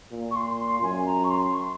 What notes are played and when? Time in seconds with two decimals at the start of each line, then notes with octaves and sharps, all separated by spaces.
0.12 A#2
0.31 C#6
0.36 C6
0.59 C6
0.82 F#2 G#5
1.06 A#5
1.24 C#6
1.29 C6
1.53 C#6
1.61 C6